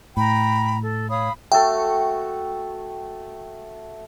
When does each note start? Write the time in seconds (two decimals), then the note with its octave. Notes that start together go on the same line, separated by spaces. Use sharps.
0.17 A2 G5 A#5 B5
0.82 A4
1.09 C#5 F5 B5 D#6
1.52 A3 F#4 A4 G5